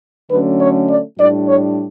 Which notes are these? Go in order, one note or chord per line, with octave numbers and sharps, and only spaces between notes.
D3 F#3 A3 C#4 B4
C#5
D5
A2 G3 D4 D5
C#5